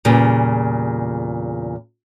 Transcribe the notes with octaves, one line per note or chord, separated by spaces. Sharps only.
E2 A#2 C#3 G3